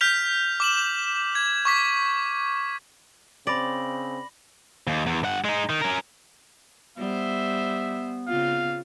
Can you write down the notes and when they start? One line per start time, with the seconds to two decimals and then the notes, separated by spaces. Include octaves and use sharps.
0.01 F6 G6 B6 F7
0.60 D6 E7 F#7
1.35 G#6
1.65 C#6 D6 B6
3.47 C#3 C4 D5 B5 A#6 F#7
4.87 D#2
5.06 E2
5.24 G2 F#5
5.44 G#3 D#4
5.70 D#3
5.81 C#4 A#4
6.98 G3 B3 C5 E5
8.28 C#3 C4 F4 F5